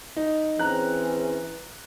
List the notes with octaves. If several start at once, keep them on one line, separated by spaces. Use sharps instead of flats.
D#4
E3 C4 C#4 G#4 A#5 F#6